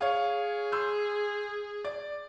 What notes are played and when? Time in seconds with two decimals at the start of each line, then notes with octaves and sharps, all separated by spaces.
0.01 G#4 C#5 F5
0.72 C6 E6 G6
1.84 D5